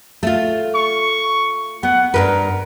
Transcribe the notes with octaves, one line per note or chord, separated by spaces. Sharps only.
A3 F4
C#6
B3 F#5
G2 A#2 A#4 B4